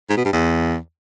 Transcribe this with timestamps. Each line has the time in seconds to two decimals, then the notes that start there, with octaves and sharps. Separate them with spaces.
0.09 G#2
0.17 B2
0.25 G2
0.33 E2